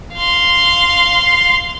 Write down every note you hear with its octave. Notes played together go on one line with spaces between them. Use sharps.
F5 C6